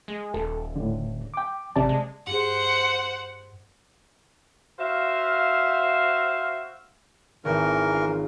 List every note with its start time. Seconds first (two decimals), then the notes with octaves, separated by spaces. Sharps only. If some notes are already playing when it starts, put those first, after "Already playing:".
0.08 G#3
0.34 D#1 A4
0.76 A2 D3
1.34 G5 D6
1.76 G#1 C3 D5 A5
1.89 G#3
2.27 G2 G#4 C5 F#5
4.79 F#4 C5 E5 F5
7.45 G#1 E3 A#4 C#6 G6
7.93 F4